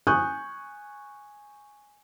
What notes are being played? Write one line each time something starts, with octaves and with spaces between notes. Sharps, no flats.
G#5 C#6 D#6 F#6 G6